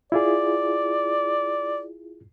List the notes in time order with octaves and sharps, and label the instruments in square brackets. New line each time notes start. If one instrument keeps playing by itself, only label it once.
[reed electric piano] E4 F4 G#4 [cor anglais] D5